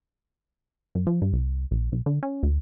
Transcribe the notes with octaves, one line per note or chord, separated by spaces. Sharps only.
F#2
F3
G2
C2
A#1
B1
D3
C#4
D2